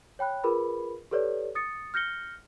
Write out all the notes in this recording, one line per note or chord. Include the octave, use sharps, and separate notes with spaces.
C#5 G5 B5 F#6
F4 G#4 A#4 B4 B5
G4 A4 B4 C#5 D5
D#6 A6 C#7
F6 G6 A#6 C#7 G7